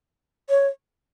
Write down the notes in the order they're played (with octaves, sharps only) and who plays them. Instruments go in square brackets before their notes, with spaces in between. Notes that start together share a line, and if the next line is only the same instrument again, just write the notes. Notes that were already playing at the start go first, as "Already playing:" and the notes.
[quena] C#5